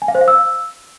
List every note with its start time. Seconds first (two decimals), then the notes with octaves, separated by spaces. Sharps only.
0.02 G#5
0.08 F5
0.15 C5
0.21 F5
0.28 E6